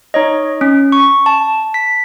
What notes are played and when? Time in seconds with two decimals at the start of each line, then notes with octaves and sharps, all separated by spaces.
0.14 D#4 C#5 D#5
0.61 C#4
0.92 C#6
1.26 A5
1.74 B6